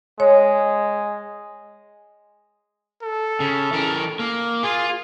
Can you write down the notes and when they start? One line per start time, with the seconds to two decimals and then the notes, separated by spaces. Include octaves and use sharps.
0.20 G#3 C#5
3.03 A4
3.40 C#3
3.73 E3 A#4
4.20 A#3
4.63 F4 G#4